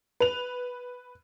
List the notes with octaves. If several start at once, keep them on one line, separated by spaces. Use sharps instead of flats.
B4 F7